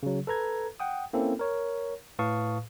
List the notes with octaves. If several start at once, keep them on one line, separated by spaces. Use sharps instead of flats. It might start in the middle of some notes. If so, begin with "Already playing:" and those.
C#3 F#3
A4 B4 A#5 G#6
F#5 G5 D#6
A#3 C4 C#4 E4 A4
A#4 C#5
A2 B4 F5 A5 C#6 D#6